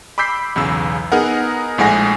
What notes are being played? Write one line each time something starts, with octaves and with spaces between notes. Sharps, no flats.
B5 D6 E6 G6 B6 C7
B1 E2 C#3 E6
B3 D#4 G#4 A#4 F#5
A#1 A2 G#3 F#5 G#5 A#6